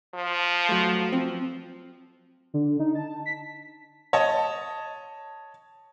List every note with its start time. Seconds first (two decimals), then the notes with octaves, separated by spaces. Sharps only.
0.14 F3
0.69 F#3 A3
1.12 F3 C4
2.54 D3
2.80 D#4
2.95 A5
3.26 B6
4.13 C#5 D#5 A5